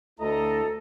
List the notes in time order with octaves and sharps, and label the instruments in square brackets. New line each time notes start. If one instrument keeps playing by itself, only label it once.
[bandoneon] D2 [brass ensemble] E4 D#5 A#5 [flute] A4